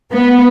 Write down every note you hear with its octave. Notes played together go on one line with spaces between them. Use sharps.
B3